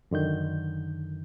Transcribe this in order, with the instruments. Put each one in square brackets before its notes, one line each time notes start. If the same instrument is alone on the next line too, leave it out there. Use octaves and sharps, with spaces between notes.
[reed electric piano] F#2 D3 D#3 G6